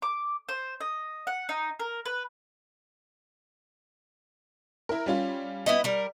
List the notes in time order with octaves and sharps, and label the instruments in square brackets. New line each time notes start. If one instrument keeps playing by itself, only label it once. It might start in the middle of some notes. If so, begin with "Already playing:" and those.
[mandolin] D6
C5
D#5
F#5
D#4
A#4
B4
[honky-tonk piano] E4 A#4
G3 C#4 F4
[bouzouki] B3 E4 D#5
G3 A#4